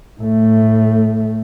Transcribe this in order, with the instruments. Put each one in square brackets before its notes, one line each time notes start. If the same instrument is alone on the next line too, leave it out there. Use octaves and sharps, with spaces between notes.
[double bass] A2 A3